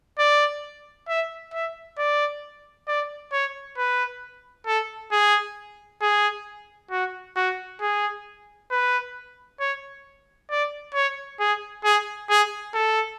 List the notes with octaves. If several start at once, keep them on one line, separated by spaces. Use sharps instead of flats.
D5
E5
E5
D5
D5
C#5
B4
A4
G#4
G#4
F#4
F#4
G#4
B4
C#5
D5
C#5
G#4
G#4
G#4
A4